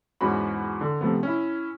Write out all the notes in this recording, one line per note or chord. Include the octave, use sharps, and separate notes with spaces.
E2 G#2 C#4 F#4 B5
D3
C3 F3 A3 B3
C#4 E4